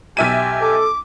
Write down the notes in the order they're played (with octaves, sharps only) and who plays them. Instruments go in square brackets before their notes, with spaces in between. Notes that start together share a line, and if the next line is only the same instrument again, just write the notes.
[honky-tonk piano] B1 E5 D#7 [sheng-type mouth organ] G4 G#5
[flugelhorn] A4 [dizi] D6